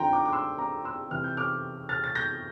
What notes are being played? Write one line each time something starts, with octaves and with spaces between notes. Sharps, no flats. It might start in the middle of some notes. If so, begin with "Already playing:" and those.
Already playing: F2 D3 F3 G5 A#5 C6
A#5 D6
D6
C6 E6
A#5 D6
C6 E6
F2 C3 E3 F6
G6
D6 F6
F6 A6
A6
G6 A#6